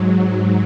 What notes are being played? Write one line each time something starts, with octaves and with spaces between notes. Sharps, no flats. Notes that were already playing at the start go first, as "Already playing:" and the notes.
Already playing: G#2 F#3